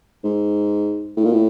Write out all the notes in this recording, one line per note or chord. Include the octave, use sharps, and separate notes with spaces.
G#2
A2
A#2
A2